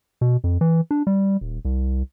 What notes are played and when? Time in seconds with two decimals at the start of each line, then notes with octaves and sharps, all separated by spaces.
0.21 B2
0.44 F2
0.61 E3
0.91 D4
1.07 G3
1.41 D#1
1.65 C2